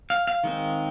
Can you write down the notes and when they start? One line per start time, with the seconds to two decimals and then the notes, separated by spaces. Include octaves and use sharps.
0.10 F5
0.27 F5
0.44 D#3 G#3 C4